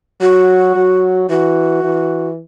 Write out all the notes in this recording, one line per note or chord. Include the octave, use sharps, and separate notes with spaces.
F#3 F#4
F#3
E3 F#4
E3